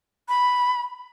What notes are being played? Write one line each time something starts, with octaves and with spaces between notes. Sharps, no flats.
B5